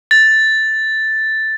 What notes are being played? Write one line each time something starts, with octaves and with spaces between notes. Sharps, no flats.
A6